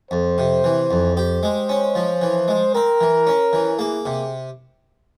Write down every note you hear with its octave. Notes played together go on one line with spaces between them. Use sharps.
F2 C5
C3
E3
F2
G4 C5
G#3
C#4
F3
E3
G#3
C4 A#4
E3
C#4
E3
A#3 G#4
C3